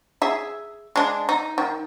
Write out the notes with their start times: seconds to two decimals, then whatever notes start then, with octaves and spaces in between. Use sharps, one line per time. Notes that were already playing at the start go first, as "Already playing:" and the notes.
0.22 G#4 E5
0.96 G#3 D4
1.29 D#4
1.58 D#3